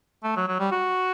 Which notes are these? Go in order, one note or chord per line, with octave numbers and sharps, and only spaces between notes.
A3
F#3
F#3
G3
F#4